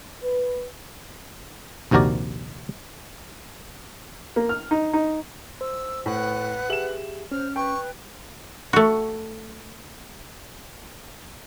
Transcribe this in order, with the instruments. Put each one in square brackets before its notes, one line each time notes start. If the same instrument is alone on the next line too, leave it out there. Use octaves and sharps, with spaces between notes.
[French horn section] B4
[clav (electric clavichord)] A#1 D#2 C3 F#4 A#4 D5
[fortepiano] A#3
F6
D#4
D#4
[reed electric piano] C5 [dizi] E6
[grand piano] A2 [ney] B4 [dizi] F#5
[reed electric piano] G4 G#4 E5 [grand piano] E7 F#7
[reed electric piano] C#4 [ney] C5 [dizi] F6
[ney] B4 [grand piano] G5 [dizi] C#6
[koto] A3 F#4